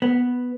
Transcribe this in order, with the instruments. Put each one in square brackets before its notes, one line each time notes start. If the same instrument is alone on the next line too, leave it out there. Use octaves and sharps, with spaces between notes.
[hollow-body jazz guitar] B3